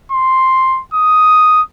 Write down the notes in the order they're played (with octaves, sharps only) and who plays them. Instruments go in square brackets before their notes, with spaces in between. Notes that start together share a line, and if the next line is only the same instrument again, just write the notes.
[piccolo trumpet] C6
D#6